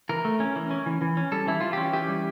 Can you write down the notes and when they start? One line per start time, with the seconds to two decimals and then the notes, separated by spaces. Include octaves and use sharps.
0.09 E3 A#4
0.25 A3
0.40 C#4
0.56 E3
0.71 C#4
0.86 E3
1.01 E3
1.17 C#4
1.32 G3 A4
1.47 E3 E4
1.61 E3 F4
1.73 C#4 G4
1.93 E3 G4
2.08 G3